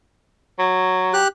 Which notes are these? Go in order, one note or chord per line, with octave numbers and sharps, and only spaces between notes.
F#3
G4 F#6